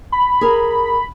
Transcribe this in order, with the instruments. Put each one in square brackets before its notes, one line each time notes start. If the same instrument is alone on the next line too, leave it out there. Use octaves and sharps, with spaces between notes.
[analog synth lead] B5
[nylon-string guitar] G#4 A#4